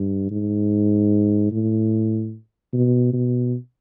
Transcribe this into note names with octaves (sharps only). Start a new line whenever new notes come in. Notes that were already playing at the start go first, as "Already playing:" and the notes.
Already playing: G2
G#2
A2
B2
B2